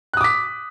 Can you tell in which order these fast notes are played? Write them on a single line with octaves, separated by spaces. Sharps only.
F#6 D#6 D6 B6